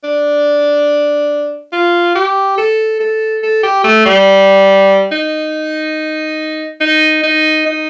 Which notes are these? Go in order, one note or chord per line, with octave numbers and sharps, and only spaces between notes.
D4
F4
G4
A4
A4
A4
G4
A3
G3
D#4
D#4
D#4
D#4